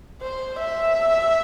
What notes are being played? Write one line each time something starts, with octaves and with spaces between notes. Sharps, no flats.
C5
E5